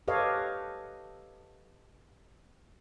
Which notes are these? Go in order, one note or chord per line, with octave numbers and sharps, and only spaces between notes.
G4 A4 B4 C#5 D#5 F5